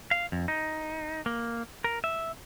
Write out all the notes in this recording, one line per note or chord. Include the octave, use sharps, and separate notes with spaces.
F5
F2
D#4
A#3
A#4
E5